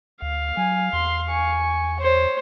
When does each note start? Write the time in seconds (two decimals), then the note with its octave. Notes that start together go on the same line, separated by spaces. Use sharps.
0.22 D2 F5
0.57 F#3 G#5
0.93 E2 C6
1.30 G#5 C#6
2.01 C5 C#5